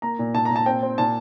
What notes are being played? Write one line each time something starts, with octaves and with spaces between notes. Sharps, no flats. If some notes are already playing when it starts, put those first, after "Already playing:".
A#3 A#5
A#2
A#2 A5
A#5
A#2
A5
C4 G5
C4
A#2 A5